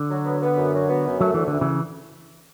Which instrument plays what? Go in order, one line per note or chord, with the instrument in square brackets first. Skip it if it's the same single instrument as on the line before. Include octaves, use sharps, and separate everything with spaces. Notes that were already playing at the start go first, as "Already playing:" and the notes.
Already playing: [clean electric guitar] D3
[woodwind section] F#3
B3
B3
F#2
F#3
B3
F#2
[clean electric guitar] F#3 [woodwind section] A3
[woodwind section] D2 [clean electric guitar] E3
[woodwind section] D2 [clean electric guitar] D3
[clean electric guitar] C#3 E3